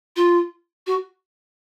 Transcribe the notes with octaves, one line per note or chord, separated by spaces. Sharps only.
F4
F#4